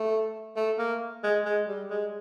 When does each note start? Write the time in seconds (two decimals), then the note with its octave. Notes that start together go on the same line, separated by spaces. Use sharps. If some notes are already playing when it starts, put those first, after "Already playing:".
Already playing: A3
0.56 A3
0.79 A#3
1.23 G#3
1.45 G#3
1.68 G3
1.90 G#3